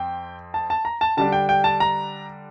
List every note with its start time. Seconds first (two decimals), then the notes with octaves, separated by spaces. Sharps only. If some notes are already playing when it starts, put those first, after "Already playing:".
Already playing: F2 C4 G5
0.54 A5
0.70 A5
0.85 A#5
1.01 A5
1.17 D3 G3 D4 A5
1.32 G5
1.49 G5
1.64 A5
1.80 A#5